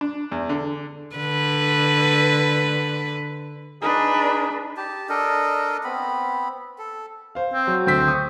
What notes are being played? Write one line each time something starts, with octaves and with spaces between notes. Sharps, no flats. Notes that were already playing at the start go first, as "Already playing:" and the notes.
D4
E2
D3
D3 B4
D4 D#4 G#4 B4
G4 A5
D4 A4 A#4 D#5
B3 C4 B5
A4
C5 F5
C4
F#3
D2 C4 C5 B6
C#6 D#6